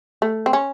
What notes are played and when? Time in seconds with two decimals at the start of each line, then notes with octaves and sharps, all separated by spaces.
0.22 A3
0.46 C4
0.53 C#4